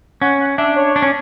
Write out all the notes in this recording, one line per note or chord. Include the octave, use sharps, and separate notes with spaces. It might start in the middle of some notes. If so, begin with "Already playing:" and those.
C#4 F#5
F#5
D4 E5
C#5
D4
C#4